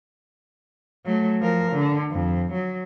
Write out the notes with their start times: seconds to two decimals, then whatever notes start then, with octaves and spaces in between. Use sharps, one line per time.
1.05 F#3 A3
1.40 F3 A#4
1.72 D3
2.11 F2
2.53 F#3